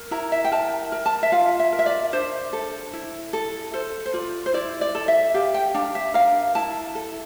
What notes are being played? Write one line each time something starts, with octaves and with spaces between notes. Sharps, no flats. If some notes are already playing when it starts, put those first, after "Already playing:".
Already playing: A#4
E4 A#5
E5
G5
A#4 A5
A#4
A5
E5
F4 F5
E5
A#4
E5
D5
D4 C5
A4
E4
A4
A4 C5
C5
F4 D5
C5
E4 D5
D5
A4
E5
G4 F5
G5
D4 F5
E5
A#4 F5
E4 A5
A4